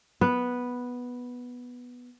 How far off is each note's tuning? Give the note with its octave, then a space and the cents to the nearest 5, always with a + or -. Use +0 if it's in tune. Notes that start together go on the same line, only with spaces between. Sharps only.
B3 -5 B4 +0